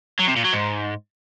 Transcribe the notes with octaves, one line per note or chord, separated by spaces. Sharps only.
F#3
C3
A#2
F#3
G#2